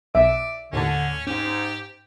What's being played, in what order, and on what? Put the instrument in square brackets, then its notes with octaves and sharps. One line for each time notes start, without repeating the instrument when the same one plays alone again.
[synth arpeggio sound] B1 [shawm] D5 [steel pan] E5
[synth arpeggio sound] D#2 A2 A5 [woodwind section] D3 [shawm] C#4
[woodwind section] G#2 [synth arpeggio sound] C#4 [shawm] G4